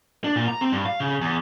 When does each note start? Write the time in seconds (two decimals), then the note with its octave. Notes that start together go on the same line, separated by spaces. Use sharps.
0.24 D4
0.36 A#2
0.48 A#5
0.61 C4
0.72 G2
0.86 F5
1.00 C#3
1.21 E2